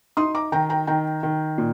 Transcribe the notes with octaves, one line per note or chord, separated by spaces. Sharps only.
D#4 C6 D#6
A#5 D6
D#3 G5 A#5
G5 A#5
D#3 G5 A#5
D#3
A#2